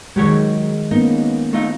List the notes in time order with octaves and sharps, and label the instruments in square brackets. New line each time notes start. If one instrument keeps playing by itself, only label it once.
[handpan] D#3 G#3 [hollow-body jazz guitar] F#3 G4 C#5
[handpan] A#3 B3 C#4 [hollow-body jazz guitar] D#4
[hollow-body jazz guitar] A3 D#4 F4